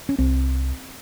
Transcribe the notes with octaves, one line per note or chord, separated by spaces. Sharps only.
C#4
C2 C4